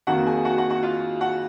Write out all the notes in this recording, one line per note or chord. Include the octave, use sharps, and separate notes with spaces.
F2 D#3 A#3 F#4 F#5
G#4 G#5
F#4 F#5
F#4 F#5
F#4 F#5
F4 F5
F#4 F#5